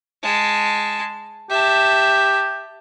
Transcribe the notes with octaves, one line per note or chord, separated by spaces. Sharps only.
G#3 A5
G4 E5 A5